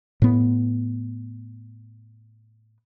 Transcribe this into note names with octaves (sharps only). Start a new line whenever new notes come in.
A2 B3